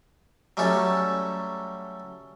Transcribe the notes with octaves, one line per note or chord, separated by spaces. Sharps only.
F#3 G3 A3 C#4 A4